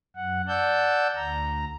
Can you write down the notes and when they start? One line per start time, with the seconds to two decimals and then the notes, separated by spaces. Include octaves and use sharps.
0.16 F#2 F#5
0.48 D5 F#5 A5 E6 G6
1.16 D2 A#5